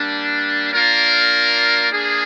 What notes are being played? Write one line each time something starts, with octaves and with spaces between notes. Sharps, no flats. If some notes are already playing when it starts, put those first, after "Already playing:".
Already playing: G3 A#3 D4
A#3 D4 F4 A#4 D5
A#3 D4 G#4